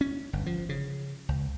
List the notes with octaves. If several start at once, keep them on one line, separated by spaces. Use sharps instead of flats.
C#4
G1
F3
C#3
C#2